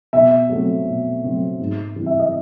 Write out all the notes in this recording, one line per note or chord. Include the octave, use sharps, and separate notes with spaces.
B2 E5
F#3 A3 C4
B2
F#3 A3 C4
G#2
E3 G3 C4
E5
D#5